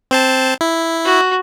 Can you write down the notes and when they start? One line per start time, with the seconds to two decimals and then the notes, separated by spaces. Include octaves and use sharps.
0.11 C4 C5 A5
0.61 E4
1.05 F#4